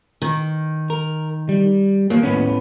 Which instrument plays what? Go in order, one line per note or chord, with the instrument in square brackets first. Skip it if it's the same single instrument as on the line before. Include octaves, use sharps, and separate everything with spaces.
[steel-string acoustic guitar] D#3
[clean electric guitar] A#4
G3
[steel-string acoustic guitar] D#2 [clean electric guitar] A#3
[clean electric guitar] A2 B3 C#4